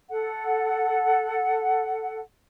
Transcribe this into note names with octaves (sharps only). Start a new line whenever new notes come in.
A4 F#5